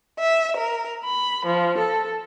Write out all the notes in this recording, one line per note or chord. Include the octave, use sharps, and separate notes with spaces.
E5
A#4
B5
F3
A4